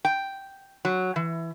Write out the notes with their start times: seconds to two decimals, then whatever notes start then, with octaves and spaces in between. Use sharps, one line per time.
0.05 G5
0.85 F#3
1.16 E3